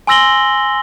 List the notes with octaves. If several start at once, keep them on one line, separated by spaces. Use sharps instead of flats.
G#5 C6 E6 A#6 F#7 G7